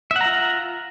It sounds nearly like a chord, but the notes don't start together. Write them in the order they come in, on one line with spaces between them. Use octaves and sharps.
E5 F#5 A#5 F4